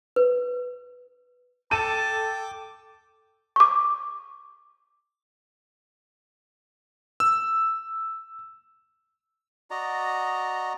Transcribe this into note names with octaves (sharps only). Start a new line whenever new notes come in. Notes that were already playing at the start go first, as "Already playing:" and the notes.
B4
A4 G5 A5 D6 D#7
C#6 D6
E6
F#4 D5 D#5 A#5